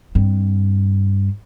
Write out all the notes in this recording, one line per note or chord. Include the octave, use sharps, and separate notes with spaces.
G2 C4